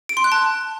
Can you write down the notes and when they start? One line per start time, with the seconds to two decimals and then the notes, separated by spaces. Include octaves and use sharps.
0.09 D7
0.17 C6
0.24 F#6
0.32 A5